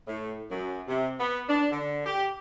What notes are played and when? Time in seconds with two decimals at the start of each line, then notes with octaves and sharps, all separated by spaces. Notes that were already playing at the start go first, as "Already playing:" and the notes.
0.07 A2
0.50 F#2
0.88 C3
1.19 B3
1.49 D4
1.71 D3
2.05 G4